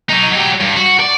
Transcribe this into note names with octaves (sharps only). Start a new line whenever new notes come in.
F#3 D#4
F#3 G4
G2
F#4
D5